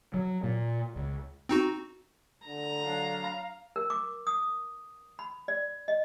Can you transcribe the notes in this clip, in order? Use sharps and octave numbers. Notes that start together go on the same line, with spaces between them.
F#3
A#2
C#2
C4 D#4 F#4
D3 A#5
F#3 D4 F5
A#4
D6
D#6
B5
D5
D#5